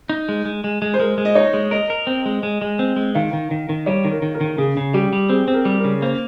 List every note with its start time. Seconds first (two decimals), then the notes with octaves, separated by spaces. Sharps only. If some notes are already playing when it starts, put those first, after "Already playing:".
0.09 D#4
0.29 G#3
0.45 G#3
0.64 G#3
0.82 G#3
0.94 C5
0.99 G#3 A#4
1.18 G#3
1.25 D#5
1.35 D#4 C#5
1.54 G#3
1.71 A#4 D#5
1.90 A#4
2.07 C4
2.26 G#3
2.43 G#3
2.62 G#3
2.79 C4
2.96 G#3
3.15 D#3 F5
3.33 D#3
3.51 D#3
3.69 D#3
3.86 G3 C#5
4.05 D#3
4.11 A#4
4.22 D#3
4.34 A#4
4.41 D#3
4.58 C#3 G#4
4.77 C#3
4.94 G3 G4
5.13 G3
5.29 C4 G#4
5.48 C4
5.54 A#4
5.65 G3
5.78 A#4
5.84 C#3
6.02 A#3 C5